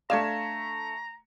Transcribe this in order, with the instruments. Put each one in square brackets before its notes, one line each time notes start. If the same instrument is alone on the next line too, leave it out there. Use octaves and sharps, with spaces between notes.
[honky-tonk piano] A3 G#6 E7 [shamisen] D4 F5 [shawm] A#5